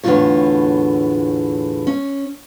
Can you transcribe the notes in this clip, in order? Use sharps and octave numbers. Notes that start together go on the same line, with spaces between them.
E2 A2 D3 D#3 F4 C#5
C#4